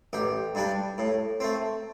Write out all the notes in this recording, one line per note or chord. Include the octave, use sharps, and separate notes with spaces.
A1 G4
G2 G3 D4
A2
A3 C4